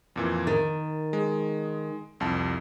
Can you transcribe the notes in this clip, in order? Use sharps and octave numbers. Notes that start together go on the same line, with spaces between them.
F2 A#2 E3
D#3 A6
G#3
C2 F2 A5